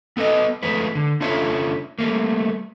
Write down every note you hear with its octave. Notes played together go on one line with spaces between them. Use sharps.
B3 A4 B4 D#5
F3 G#3 A3 B4
D3
C#3 D4 F4 A4 C#5 E5
G3 A3 A#3